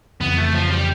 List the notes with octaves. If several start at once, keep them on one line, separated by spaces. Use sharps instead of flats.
F1 F2 C#3 E3 B3
A3
F3
G3